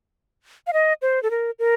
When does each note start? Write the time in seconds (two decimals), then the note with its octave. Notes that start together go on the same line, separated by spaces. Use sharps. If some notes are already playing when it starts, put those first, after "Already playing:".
0.67 F5
0.73 D#5
1.02 C5
1.23 A4
1.31 A#4
1.59 A#4